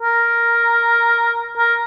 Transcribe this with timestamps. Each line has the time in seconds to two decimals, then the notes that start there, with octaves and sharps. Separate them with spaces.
0.01 A#4
1.57 A#4